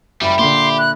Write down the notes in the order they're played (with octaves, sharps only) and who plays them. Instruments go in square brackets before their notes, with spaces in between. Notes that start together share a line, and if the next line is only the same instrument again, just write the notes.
[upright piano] F#1 [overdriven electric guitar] G3 G4 [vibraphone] E5 B5
[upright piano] A#2 D3 [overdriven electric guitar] G4 [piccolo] C6
[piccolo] F#6